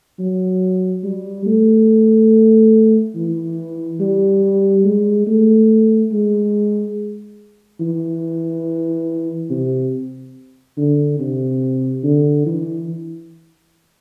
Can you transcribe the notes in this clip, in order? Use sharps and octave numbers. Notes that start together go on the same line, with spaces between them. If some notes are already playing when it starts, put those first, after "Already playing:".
F#3
G3
A3
E3
G3
G#3
A3
G#3
E3
C3
D3
C3
D3
E3